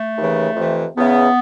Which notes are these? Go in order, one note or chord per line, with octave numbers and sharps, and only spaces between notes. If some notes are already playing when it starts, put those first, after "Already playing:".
Already playing: A3
D#2 C#3 E3
F2 C3 E3
E2 C#3 E3 B3